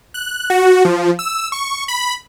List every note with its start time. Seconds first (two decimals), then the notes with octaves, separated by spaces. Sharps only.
0.14 F#6
0.50 F#4
0.85 F3
1.19 E6
1.52 C#6
1.88 B5